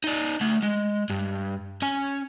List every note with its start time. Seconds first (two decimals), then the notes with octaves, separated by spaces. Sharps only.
0.04 D#4 D5
0.41 A3 F#5
0.63 G#3
1.10 G2
1.82 C#4 G#5